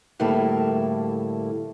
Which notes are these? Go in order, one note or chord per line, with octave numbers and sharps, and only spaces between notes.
D2 A2 G3 A#3 E4 A4